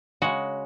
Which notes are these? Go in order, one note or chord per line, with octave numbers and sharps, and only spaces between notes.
C#3 G#3 F#4